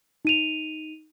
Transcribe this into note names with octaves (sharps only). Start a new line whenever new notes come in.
D#4 D#7 F7